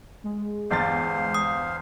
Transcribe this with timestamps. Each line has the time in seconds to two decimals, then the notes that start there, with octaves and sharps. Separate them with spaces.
0.24 G#3
0.71 G1 E2 C5 F5 A6
1.34 D#6